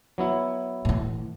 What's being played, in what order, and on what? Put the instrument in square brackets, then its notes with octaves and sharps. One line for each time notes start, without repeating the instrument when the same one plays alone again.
[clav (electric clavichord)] F#3 B3 E4
[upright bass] A2 E3